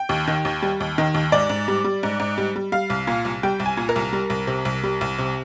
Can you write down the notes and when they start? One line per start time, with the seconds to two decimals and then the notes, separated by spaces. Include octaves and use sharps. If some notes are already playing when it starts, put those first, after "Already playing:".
Already playing: G5
0.09 D#2
0.28 D#3
0.45 D#2
0.62 G3
0.80 D#2
0.98 D#3
1.14 D#2
1.32 G#2 D5
1.50 G#2
1.68 G3
1.84 G3
2.03 G#2
2.20 G#2
2.38 G3
2.56 G3
2.72 G3 F5
2.90 C2
3.07 A#2
3.25 C2
3.43 G3 G5
3.60 C2
3.66 G#5
3.77 A#2
3.89 A#4
3.96 C2
4.13 G3
4.30 C2
4.47 C3
4.65 C2
4.83 G3
5.01 C2
5.18 C3